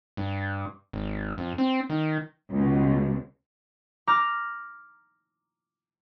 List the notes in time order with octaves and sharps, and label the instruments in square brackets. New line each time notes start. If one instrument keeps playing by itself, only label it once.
[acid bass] G2
G#1
F2
C4
D#3
[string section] C#2 B2
[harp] A#5 D6 F6 G6